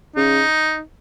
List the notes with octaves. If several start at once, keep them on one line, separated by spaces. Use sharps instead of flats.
C#3 D#4